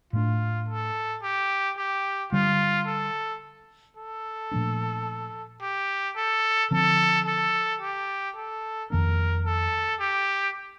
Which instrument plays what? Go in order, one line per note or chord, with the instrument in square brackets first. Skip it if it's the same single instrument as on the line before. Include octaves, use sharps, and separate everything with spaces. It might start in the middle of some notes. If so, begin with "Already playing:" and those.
[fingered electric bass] A2 A3 D4 [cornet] F4
[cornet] A4
G4
G4
[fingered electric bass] D3 G3 D4 [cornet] F4
[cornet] A4
A4
[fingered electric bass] A#2 F3 A3 D4
[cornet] G4
A4
[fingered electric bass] D3 F3 C4 [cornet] A4
[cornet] A4
G4
A4
[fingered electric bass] F2 D#3 A#3 D4 [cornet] A#4
[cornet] A4
G4